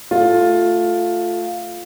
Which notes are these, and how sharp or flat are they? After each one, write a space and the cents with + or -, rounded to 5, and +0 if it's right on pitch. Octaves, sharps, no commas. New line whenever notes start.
A3 +0 F4 +10